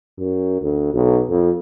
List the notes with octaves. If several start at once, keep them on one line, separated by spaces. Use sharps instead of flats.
F#2
D2
B1
F2